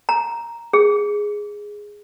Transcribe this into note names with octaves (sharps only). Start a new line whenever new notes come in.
A#5
G#4